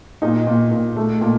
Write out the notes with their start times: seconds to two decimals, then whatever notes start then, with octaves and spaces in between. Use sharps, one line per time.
0.22 A#2 D#4
0.47 A#2
0.71 A#2
0.96 A3
1.21 A#2